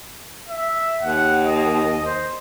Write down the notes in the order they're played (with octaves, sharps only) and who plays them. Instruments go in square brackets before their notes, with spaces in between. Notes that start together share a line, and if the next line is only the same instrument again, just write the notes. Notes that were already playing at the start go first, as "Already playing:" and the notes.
[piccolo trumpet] E5
[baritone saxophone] D#2 [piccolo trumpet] F#5
[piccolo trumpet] D#5
C5